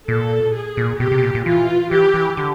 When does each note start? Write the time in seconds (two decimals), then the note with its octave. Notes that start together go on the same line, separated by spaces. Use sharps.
0.08 A#2 A4
0.54 G#4
0.77 A#2
1.00 B2 G4
1.12 C3
1.18 B2
1.23 A#2
1.35 A#2
1.45 E3 F4
1.91 E3 G4
2.14 E3
2.37 D3